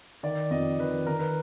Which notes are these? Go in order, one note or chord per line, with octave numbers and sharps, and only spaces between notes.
D#3 D5
F2 D#5
D#3 B4
D#3 A#4
B4